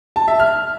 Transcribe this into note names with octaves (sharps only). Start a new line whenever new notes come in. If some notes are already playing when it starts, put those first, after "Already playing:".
A5
E5
F6